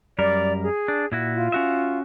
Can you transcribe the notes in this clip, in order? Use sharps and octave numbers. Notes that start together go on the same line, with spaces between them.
F#2 G3 A#4 D5
G#4
D4
A#2 E4 F#4
F4
C#4 F#4 E5